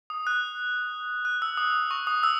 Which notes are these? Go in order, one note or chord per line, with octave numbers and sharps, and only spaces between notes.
D#6
F#6
F#6
E6
D#6
C#6
D#6
E6